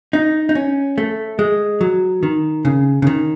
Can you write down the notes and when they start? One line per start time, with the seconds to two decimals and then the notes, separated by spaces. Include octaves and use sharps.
0.13 D#4
0.49 D#4
0.55 C#4
0.98 A3
1.39 G#3
1.81 F#3
2.23 D#3
2.65 C#3
3.02 C#3
3.07 D#3